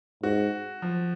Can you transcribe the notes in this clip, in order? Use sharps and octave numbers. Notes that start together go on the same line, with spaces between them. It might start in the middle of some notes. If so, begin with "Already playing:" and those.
G#2 F#4
F3